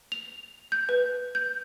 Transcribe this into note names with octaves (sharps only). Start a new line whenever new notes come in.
F7
G6
B4
G6